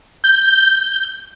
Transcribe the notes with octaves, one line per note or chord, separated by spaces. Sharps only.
G6